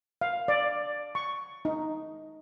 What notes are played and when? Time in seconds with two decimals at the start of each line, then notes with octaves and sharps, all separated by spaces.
0.21 F5
0.48 D5
1.15 C#6
1.65 D#4